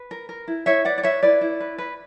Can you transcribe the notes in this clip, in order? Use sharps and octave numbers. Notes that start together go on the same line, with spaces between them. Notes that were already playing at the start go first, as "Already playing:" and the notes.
Already playing: B4
A#4
A#4
E4
E4 C#5 E5
B4 D5 F#5
D5
B4 C#5 E5
E4 B4 D5
E4
B4
B4